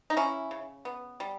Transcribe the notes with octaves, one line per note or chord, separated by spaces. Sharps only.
D#4
C#3 C#4 E4
C#3
B3
G3